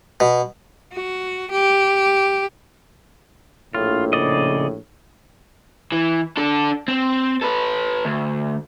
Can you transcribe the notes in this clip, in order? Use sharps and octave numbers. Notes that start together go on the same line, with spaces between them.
B2
F#4
G4
A#1 A2 F4
C#3 D5 D#5
E3
D4 A4
C4
A4 B4
D2